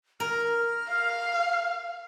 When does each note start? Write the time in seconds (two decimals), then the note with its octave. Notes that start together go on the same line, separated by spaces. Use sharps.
0.20 A#4 F6
0.88 F5